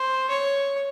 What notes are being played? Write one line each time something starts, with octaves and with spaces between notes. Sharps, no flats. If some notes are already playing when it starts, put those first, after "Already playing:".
Already playing: C5
C#5